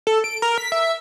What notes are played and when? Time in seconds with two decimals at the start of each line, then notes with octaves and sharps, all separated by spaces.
0.07 A4
0.24 D7
0.42 A#4
0.58 B6
0.72 E5